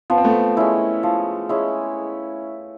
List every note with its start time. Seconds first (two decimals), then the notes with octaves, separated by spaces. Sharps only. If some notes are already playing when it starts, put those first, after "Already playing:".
0.10 F3 B3
0.18 C4
0.24 A3 B3
0.57 G#3 C#4 E4
1.03 F3
1.49 G#3 C#4 E4